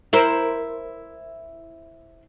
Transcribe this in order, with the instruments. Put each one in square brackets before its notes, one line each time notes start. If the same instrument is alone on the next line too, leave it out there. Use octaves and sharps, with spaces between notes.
[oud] E4 A#4 C5